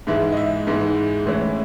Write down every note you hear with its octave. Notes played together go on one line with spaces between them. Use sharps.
G#2 E3 G#3 E5
D#5
E5
G#2 E3 G#3
A2 E3 G#3 C#4 E4